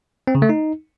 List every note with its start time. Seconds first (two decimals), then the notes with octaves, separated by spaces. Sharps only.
0.27 C4
0.35 C#3
0.42 A3
0.49 D#4